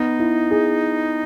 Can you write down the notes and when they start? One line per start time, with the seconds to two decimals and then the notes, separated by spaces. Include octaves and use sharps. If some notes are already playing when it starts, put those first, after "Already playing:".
Already playing: B3 D#4
0.19 E4
0.51 G#4